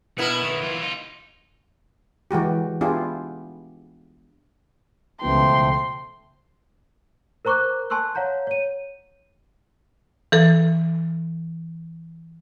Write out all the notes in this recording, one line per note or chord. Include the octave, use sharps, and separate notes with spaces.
B2 B3 E4 A#4
B1 D#3
E3 F4
D#4 F4
E3 G#3 F#4 G4
B3 D4 E4 F4 G4 G#4
C#2 B2 E3 F3 A3 G5 C6
A#4 C5 A#5 C#6 D6 F#6
G#5 A5 C6 C#6 E6 F#6
C#5 F5 F#5 A#5 G6
C#5 D#7
E3 A4